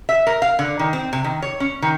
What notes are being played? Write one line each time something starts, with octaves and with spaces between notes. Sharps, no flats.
E5
A#4
F5
D3
D#3
C4
C3
D#3
C#5
C#4
D#3